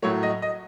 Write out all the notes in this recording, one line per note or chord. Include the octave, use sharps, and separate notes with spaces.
A2 F#3 A3 C#5
D#5
D#5